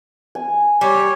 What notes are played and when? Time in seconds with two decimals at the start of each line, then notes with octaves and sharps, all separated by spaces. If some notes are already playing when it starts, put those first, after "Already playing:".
0.35 G#5
0.81 G3 C#5